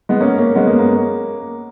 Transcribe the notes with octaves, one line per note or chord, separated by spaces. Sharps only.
G#3 B3
A#3 C#4
A#3 C#4
G#3 B3
A#3
A#3